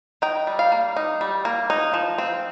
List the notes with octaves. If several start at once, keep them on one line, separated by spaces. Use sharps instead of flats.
D#4 G5
G3
F5
A#3
D#4
G3
A#3
D#4
F3
C4